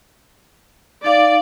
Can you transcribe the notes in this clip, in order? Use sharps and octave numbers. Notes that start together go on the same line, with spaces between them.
D#4 D5 F5 D6